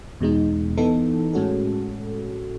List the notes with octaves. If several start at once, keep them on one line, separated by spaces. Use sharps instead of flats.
E2 B2 G#3 D#4
E3 B3 D#4 A4
A2 G#3 C#4 F#4 A4